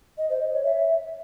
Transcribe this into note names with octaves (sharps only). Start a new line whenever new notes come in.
D#5
C5
D#5
C#5
E5